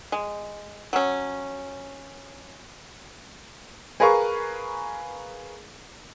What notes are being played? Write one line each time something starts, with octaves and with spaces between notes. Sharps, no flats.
G#3
F#3 C#4
G#4 A#4 B4 F5 A#5 C#6